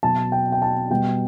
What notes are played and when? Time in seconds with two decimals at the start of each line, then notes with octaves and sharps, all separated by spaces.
0.03 B2 F#3 A5
0.32 G5
0.52 G5
0.62 A5
0.90 B2 G3 G5